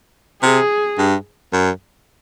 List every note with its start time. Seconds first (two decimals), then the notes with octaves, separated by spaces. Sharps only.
0.42 C3 G#4
0.98 G2
1.53 F#2